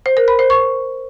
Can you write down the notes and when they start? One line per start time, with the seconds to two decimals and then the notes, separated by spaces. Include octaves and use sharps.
0.06 C5
0.17 A#4
0.28 B5
0.39 C5
0.50 C#6